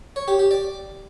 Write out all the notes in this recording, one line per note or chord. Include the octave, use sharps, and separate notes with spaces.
C#5
G4
G4
D5